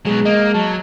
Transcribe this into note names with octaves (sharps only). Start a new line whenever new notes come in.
B2 F#3 G#3 G#4
A#3 D#5
F#3 A5